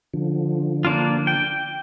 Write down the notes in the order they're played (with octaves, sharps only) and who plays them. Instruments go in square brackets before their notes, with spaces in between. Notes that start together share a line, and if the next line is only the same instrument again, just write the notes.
[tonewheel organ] D3 F3
[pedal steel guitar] A#3 D4 F4
G5